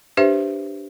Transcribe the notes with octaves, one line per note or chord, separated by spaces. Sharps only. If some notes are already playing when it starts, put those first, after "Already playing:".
D4 G4 B4 C5 E5